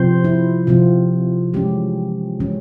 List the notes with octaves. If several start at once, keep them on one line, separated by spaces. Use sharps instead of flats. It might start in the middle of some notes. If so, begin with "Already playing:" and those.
Already playing: C3 F3 C4 C5
E4
C3 F3 C4 F4
E3 G#3 C#4 G4
E3 G#3 C#4